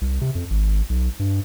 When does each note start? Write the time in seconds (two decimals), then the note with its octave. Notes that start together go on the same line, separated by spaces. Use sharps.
0.01 C2
0.21 C3
0.35 F2
0.50 G#1
0.89 B1
1.19 G2